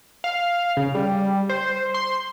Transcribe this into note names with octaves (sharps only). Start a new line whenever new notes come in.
F5
C#3
G3
C5
C6